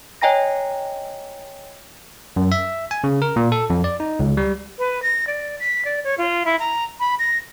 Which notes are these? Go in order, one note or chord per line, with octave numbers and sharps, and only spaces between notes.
C#5 D#5 G5 G#5 A#5 A#6
F#2
E5
G#5
C#3
A#4
A#2
A4
F2
D5
D#4
C#2
G3
B4
A#6
D5
B6
D5
C#5
F4
E4
A#5
B5
A#6